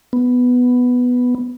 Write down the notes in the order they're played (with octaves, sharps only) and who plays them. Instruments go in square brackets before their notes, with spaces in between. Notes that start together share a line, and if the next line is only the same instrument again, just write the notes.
[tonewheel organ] B3